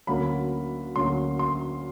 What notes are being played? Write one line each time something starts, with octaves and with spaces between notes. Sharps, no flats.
D2 D3 F#3 A#3 C#4 B5
D2 D3 F#3 A#3 C#4 C6
C6